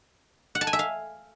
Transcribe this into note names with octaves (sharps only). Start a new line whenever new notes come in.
F#5
A5
G#5
E5
F5